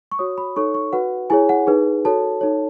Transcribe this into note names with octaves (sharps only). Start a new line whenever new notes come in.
C#6
F#4 C#5 D#6
B5
D#4 A4 C#5 C#6
C#6
F#4 B4 F#5
E4 G#4 C#5 G#5
F#5
D#4 G#4 B4
F#4 A4 C#5 A5
D#4 A4 C#5